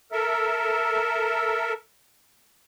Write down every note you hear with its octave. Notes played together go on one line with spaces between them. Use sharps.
A4 A#4 E5